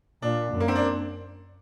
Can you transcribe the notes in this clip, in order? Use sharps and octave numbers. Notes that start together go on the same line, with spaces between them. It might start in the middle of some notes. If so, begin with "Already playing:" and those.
A#2 D4
F#2
A#3
C4
D4